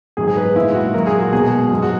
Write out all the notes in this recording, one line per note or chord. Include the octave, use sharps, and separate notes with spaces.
G#2 D#3 F#3 G#4
G#4
B4
A#2 G#3 E4
F#4
A#2 F#3 A#4
G#4
F#4
B2 G#3 G#4
G#2 F#3
F#4